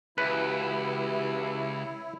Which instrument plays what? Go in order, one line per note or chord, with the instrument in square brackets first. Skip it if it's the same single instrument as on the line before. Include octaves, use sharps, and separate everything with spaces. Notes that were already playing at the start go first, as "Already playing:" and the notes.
[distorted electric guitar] C#2 [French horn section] E3 F#4 G4 [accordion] E4 [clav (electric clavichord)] B4